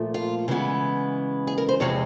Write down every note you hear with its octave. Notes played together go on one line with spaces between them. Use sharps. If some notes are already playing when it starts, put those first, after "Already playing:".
Already playing: A#2 F3 A3
F4
C#3 E3 G#3 B3
G#4
A#4
C5
E2 C3 F3 G#3 C#5